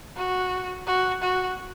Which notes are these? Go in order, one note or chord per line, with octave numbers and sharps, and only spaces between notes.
F#4
F#4
F#4